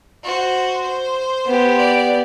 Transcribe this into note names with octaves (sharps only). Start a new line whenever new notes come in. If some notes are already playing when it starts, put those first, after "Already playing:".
F#4 C5
C5
B3 G4
D5